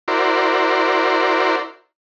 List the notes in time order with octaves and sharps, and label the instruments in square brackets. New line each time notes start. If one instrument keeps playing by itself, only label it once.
[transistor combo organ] E4 F#4 A#4 C5 D5